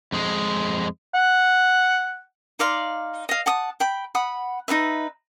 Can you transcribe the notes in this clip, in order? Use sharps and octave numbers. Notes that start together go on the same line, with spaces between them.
F2 G#3
F#5
D#4 D5 F5 C6
D#5 F5
F#5 A5 D#6
G5 B5
F#5 B5 D#6
D#4 E4 B4 E5